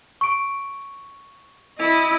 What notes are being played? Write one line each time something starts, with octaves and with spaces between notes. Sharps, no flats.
C#6 D7
E4 D#5